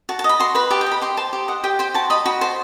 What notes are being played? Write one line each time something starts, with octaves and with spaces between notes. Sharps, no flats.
F#4 A5
A5
D#5
B5
F#4 C6
B4 B5
G4 A5
G5
D#5
B5
G4 C6
C5 A5
G4
D#5 F#5
G4 G5
C5 G5
F#4 A5
D#5 B5
F#4 B5
C5 A5